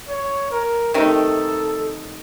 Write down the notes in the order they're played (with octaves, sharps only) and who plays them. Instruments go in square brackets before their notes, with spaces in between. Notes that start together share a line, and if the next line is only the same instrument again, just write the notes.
[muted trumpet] C#5
A#4
[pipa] C3 D#3 A3 D#4 [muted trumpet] A4